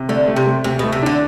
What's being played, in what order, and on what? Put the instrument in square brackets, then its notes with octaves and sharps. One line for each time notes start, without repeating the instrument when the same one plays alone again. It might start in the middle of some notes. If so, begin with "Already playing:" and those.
Already playing: [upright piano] C3
[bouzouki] D3 [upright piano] A3
[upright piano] A3
[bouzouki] C3
[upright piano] A3
[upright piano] D2 [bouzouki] C3
[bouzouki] B2 [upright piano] A3
[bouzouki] C3
[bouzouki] D3 [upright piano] D4